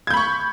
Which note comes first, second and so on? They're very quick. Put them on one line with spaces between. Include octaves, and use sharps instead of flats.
G#6 G6 B5 C#6